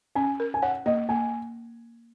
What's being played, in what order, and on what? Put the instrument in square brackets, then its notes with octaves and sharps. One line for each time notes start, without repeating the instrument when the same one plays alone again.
[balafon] C#4 [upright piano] G#5
[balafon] A#4
[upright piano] G#5
[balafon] C#5 [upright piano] F#5
[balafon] A#3 [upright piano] D#5
[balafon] A#3 [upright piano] G#5